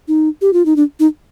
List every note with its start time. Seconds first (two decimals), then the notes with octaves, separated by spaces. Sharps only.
0.08 D#4
0.41 G4
0.53 F4
0.66 D#4
0.76 D4
1.00 D#4